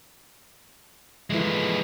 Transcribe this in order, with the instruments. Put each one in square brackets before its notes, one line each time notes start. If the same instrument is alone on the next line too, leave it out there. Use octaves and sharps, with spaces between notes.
[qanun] E3 A3 [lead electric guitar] F3 G#3